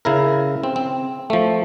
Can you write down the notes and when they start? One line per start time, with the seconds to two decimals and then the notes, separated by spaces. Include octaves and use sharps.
0.05 C#3 E4 A#4
0.64 C4
0.76 C4
1.30 F3 A3